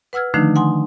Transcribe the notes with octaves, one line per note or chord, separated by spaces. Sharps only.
B4 F#5 E6 F6 G#6
D3 D#3 F3 A3 D4 D#4
F#5 G#5 C6 D#6